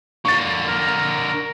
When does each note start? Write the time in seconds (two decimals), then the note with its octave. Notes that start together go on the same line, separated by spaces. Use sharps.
0.25 D3 A#3 C#6 A6
0.67 A#4